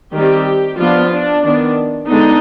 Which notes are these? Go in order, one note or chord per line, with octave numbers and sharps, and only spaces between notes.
D#3 G3 C4 G4
F3 B3 D4 F4
D4
D#3 B3 D4
D3 G#3 B3 D4 D#4